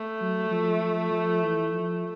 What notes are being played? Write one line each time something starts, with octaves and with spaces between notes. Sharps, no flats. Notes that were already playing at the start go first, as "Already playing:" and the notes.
Already playing: A3
F#3
F3
F3
F3
E3
F3